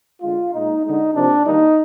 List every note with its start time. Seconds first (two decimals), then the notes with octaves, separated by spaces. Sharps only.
0.22 D3 G#3 F4
0.53 A#2 G#3 D#4
0.84 D3 G#3 D#4
1.15 C3 F3 A#3 D4
1.46 D#3 G3 A#3 D#4